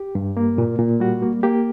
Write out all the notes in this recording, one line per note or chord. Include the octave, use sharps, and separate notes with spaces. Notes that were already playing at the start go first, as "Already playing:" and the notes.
Already playing: G4
G2
A#3
A#2
A#2
G3 F#4
A#3
A#3 G4